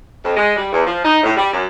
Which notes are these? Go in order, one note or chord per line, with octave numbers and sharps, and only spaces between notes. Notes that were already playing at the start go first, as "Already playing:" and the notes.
F2
G#3
G3
E2
F3
D#4
A2
G3
F#2